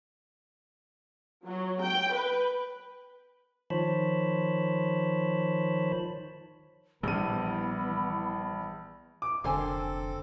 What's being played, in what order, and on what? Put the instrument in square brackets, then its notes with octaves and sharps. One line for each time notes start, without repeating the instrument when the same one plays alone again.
[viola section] F#3
G5
B4
[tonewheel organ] D#3 F3 C5 C#5 A5 B5
[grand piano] A#1 D#7 [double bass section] E3 B3 [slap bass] G3 [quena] B5
[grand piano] D6
[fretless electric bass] F1 D3 [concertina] C4 A4 [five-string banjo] A#4 C5 G#5